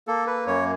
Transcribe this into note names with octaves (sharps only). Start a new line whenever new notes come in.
A#3 A4
B4
F#2 C#5